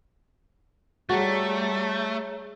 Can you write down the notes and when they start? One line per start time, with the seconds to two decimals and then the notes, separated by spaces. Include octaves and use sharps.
1.09 G3 A3 F#4 G#4 C#5 A#5